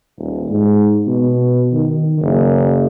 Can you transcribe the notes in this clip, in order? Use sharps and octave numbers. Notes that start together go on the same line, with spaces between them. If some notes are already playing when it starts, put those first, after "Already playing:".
D#1
G#2
B2
D#3
F#1